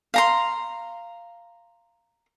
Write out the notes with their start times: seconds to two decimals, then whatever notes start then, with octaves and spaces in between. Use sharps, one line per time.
0.14 F5 A#5 C6